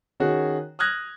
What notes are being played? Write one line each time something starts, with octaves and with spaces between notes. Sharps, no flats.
D#3 C#4 F#4 G#4
D#6 F6 F#6 G#6 A#6